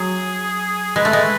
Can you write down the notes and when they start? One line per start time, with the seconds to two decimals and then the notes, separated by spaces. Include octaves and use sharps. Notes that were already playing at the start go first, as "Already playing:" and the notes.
Already playing: F#3 G#4
0.96 G#3 B4
1.05 A3
1.13 G#3